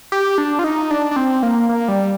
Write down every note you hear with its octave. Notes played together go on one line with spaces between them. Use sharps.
G4
D4
F4
D#4
D4
D4
C4
A#3
A#3
G3